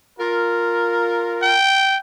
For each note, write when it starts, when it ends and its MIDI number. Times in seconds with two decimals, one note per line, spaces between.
0.19 1.54 65
0.19 1.54 70
1.43 1.98 79